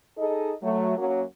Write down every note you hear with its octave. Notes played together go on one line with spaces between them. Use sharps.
D#4 G#4 A4 D#5
F#3 A3
F#2 F#3 A#3